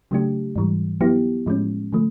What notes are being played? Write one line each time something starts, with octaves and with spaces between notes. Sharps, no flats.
C#3 F#3 A3 D4 G4
G#2 E3 G3
F#3 B3 E4 G4
A2 F3 G#3 C#4
D3 F3 A3